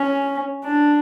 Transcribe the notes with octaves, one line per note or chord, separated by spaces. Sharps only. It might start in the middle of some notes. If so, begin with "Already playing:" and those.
Already playing: C#4
D4